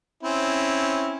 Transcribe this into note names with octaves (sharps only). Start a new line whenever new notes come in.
C4 C#4 E4